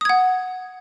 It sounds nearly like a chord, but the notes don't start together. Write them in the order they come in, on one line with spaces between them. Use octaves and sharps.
D#6 G#6 F#5